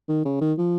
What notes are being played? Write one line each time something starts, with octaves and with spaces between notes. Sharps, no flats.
D#3
C#3
D#3
F3